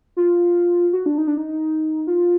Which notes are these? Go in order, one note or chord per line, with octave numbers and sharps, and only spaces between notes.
F4
F#4
D4
D#4
D4
D#4
F4